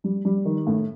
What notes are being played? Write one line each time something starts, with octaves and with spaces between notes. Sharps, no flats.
G3
G3
D#3
A2